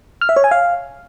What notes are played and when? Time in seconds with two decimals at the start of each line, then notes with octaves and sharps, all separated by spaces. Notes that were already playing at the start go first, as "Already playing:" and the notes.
0.21 F6
0.29 E5
0.36 C#5
0.44 G#5
0.51 F5